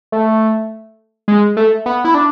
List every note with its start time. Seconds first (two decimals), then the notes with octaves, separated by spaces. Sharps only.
0.12 A3
1.28 G#3
1.57 A3
1.86 B3
2.05 E4
2.14 D4